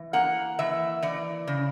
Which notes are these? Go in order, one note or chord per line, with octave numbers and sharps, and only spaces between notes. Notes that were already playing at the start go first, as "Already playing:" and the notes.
Already playing: E3
A#3 F#5
E3 E5
E3 D5
C#3